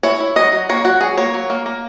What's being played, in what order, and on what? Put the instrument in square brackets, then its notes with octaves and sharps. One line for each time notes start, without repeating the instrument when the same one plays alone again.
[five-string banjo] E4 C#5
E4
F#3 D#5
F#3
A#3 C#5
F#3 F#4
F#3 G#4
A#3 C#5
F#3
A#3
A#3